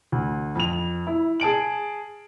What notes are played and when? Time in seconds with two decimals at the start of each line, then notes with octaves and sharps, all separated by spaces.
0.12 D2
0.55 F2 F7
1.07 E4
1.40 G#4 A5 D7 F#7